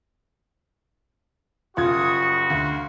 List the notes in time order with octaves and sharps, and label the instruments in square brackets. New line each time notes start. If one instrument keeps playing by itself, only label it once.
[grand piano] F#1 G#6 [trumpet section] G3 F#4 C#6 [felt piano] F4 [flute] D#6
[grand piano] D2 [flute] F5